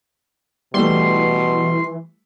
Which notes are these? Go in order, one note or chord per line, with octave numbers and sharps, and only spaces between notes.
B2 E3 G3 A3 C6